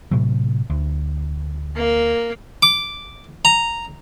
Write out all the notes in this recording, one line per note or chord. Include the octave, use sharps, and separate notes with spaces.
A2 C3 F#3
D2
A#3
D6
A#5